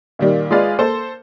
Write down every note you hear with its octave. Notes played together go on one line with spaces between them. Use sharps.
A#2 D#3 G3
G#3 F4 G#4 B4 D5 F5
A#3 A4 C5